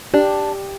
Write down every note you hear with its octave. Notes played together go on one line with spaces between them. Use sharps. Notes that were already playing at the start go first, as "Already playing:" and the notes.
D4 G4